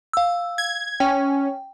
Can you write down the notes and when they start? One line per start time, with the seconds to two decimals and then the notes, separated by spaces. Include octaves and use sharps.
0.13 F5 E6
0.58 G#6
1.00 C#4 G5